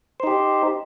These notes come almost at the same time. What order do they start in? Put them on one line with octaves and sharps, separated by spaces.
C5 D#4 G4